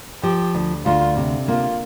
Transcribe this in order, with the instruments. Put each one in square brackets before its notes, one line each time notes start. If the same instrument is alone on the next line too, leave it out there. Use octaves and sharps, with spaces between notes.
[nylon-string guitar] F3 [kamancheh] G4
[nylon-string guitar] D2
[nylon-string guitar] D2 [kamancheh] F4
[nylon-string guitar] C3
[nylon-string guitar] A#3 [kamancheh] F4